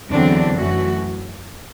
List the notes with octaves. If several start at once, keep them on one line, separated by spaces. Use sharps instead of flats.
E2 D3 F#3 C4 D4
F#2 E3 A3 F#4